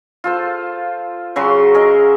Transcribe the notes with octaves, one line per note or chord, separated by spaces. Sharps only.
F4 A4 C5
C#3 F#3 F#4 C6
G#4 A#4 D#5 E5